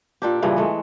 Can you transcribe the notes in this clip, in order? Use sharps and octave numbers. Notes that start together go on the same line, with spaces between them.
A#2 D4 G4
G2 A#2 C#3 E3
G#3 A3 B3